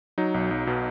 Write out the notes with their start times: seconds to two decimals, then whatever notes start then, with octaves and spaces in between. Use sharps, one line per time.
0.18 F#3 D#4
0.34 B1
0.51 B1
0.67 B2